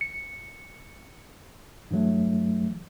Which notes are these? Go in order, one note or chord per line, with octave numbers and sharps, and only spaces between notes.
C#7
G2 E3 F#3 A3